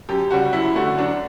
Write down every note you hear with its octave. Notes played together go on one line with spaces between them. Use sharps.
F#2 G4
C#3 G3 F#4
F#2 E4
D3 A3 F#4
F#2 D4